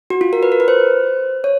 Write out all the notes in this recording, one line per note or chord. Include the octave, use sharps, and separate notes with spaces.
F#4
F4
A#4
B4
A#4
B4
C5
C#5